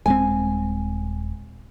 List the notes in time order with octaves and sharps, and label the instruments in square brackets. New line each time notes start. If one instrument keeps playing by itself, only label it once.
[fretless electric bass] D#1 G#3 C4 [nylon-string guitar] G#5